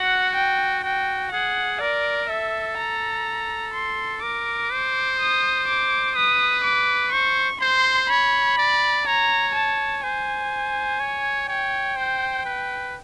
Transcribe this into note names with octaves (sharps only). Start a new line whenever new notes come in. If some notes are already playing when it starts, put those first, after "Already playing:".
Already playing: F#4 F#5
G5
F#4 G5
G#4 F#5
A#4 D5
A4 E5
A#5
C6
A#4 D6
C5
D#6
D6
B4 D#6
D6
C5 C#6
C5 C6
C#5 B5
D5
C#5 A#5
A5
C5 G#5
C#5
C#5 G5
C5
B4